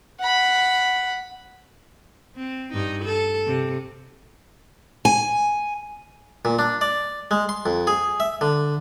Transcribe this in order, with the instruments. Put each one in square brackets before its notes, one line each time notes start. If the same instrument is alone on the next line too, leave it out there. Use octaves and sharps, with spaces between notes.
[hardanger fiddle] F#5 B5
[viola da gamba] C4
G2 D#4
A4
C3
[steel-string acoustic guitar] G#5
[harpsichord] A#2
D4
D5
G#3
C6
F2
G#4
E5
D3